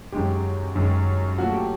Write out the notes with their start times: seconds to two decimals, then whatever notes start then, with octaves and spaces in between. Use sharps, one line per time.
0.12 F#2 D#3 G#3 G4
0.76 F#2 D#3 G#3
1.38 A#2 F#3 A3 F#4
1.54 G4